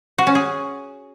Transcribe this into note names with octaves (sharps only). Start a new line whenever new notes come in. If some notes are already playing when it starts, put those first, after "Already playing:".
F#4
C#4
G#4